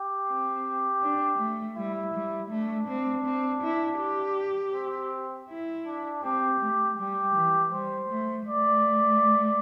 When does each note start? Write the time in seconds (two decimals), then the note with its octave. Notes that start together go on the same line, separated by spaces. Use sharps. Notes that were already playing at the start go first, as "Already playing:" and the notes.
Already playing: G4
0.28 C4
1.03 D4
1.39 A3
1.77 G3 E4
2.14 G3
2.51 A3 D4
2.88 C4
3.26 C4
3.63 E4
4.00 G4
4.74 C4
5.49 E4
5.86 D4
6.23 C4 G4
6.60 A3
6.98 G3 G4
7.35 E3
7.72 G3 C5
8.10 A3
8.47 A3 D5